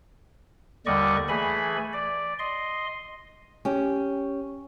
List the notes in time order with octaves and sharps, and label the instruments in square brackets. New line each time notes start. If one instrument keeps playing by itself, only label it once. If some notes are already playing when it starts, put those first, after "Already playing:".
[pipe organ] D#2 D3 G3 D5 D#5 C#6
E3 A3 G#4 G#5 B5
D5
D#5 C6
[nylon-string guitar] C#4 G4